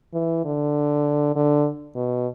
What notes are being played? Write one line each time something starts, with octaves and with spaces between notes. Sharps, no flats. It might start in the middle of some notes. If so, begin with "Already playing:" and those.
E3
D3
D3
B2